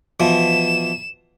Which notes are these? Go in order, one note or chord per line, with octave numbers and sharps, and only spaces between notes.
B2 E3 F3 E7